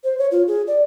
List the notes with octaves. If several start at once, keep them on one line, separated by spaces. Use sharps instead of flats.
C5
C#5
F4
G#4
D5